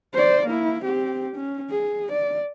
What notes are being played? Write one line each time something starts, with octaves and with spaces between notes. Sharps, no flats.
C5 D5
A#3 E4
C4 G4
C#4
G#4
D5